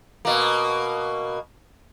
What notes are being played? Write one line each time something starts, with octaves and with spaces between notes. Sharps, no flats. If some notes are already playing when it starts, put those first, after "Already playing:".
B2 A#3